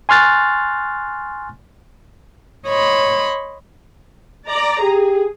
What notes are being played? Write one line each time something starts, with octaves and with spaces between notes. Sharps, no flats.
G#5 C6 C#6 F6 F#6 A6
C#5 D#5 B5 C6
D5 A#5
G4 G#4